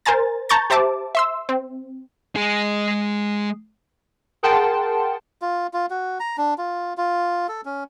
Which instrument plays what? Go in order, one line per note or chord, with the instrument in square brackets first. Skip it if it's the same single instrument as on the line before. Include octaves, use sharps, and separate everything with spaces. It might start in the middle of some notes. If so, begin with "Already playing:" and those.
[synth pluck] A#4 C5 G#5 A#5 A6
A5 A#5 C#6 G6 A6
G4 C5 E5 A5 D6
E5 C6 E6
C4
[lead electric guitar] G#3 G#4
[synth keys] G#4 A#4 F#5 G5 A5 C6
[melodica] F4
F4
F#4
A#5
D4
F4
F4
A4
C#4